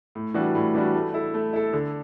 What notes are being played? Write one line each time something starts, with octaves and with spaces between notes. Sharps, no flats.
A2
E3 G3 D4 F#4
A2
E3 G3 D4 F#4
A3
E4 A4
A3
E4 A4
D3